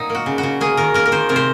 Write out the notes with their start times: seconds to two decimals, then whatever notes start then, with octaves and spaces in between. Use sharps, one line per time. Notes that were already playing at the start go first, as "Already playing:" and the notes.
Already playing: A#2 F#3 D#4
0.10 A#3
0.15 F#4
0.26 C#3
0.38 F#4
0.43 C#3
0.61 A#3 G#4
0.77 D#3 A#4
0.94 A#3 A#4
1.06 A#4
1.12 D#3 C5
1.29 C3 A#4
1.36 C5